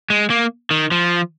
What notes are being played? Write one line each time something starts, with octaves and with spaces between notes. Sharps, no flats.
G#3
A#3
D#3
F3